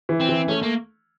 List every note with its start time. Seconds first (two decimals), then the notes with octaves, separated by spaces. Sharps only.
0.09 E3
0.20 C4
0.29 E3
0.48 A3 C#4
0.63 A#3